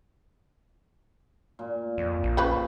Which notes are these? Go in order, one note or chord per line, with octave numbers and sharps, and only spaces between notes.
A#2
F2
A#1
F3 C#4 B4